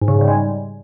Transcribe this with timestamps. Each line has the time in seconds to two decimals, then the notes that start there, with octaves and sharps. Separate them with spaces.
0.02 G#2
0.08 C#3
0.15 G#2
0.21 G3
0.28 G#3